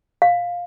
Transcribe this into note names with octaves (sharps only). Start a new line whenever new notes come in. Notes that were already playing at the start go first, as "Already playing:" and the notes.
F5